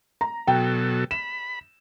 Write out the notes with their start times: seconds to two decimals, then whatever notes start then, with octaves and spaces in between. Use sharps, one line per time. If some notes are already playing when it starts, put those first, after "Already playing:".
0.21 A#5
0.47 B2 F#3 A4 G5
1.11 B5 E7